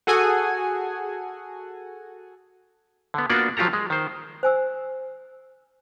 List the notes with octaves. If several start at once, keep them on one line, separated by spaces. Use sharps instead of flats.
F#4 G#4 A4 F#5 G#5
D3 B3
A#3 B3 D4 F4 F#4 D5
F3 F#3 F4 G4 A4 A#5
G#3
D#3 C5
C5 G#5 E6